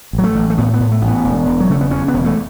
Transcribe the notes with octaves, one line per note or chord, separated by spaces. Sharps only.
A1
F#3
A3
A1
A3
A2 B3
B3
A2
A3
A1
B3
E1
E1
F#3
C#3 A3
B3
E2 C#4
B3
E1
A3